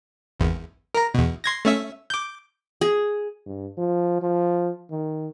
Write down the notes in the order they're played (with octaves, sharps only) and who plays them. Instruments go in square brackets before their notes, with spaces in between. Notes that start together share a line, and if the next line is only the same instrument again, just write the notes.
[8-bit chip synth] G#1 E2
A#4 A#5
E2 B2
C6 G#6 A#6
A3 C#4 E5
D6 G6
[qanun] G#4
[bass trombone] G2
F3
F3
D#3